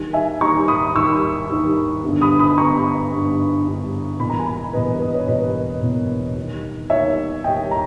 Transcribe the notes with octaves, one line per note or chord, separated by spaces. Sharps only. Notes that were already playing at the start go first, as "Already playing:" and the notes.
Already playing: D#2 D#3 G3
E5 G#5
D#2 D#3 G3 A#5 C#6
B5 D#6
D#2 D#3 G3 C#6 E6
D#2 D#3 G3
G1 G2 G3 B3
B5 D#6
B5 D#6
G1 G2 G3 B3 A#5 C#6
G1 G2 G3 B3
G1 G2 G3 B3
E1 E2 B2 G3 A#3 B5
A#5
G#5 B5
E1 E2 B2 G3 A#3 B4 D#5
B4 D#5
B4 D#5
C#5
E1 E2 B2 G3 A#3 B4 D#5
E1 E2 B2 G3 A#3
D#2 D#3 G3
D#2 D#3 G3 C#5 E5
D#2 D#3 G3 D#5 G5
A#5